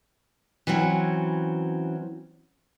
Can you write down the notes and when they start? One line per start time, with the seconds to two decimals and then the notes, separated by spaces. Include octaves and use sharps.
0.67 E3 F#3 C4 C#4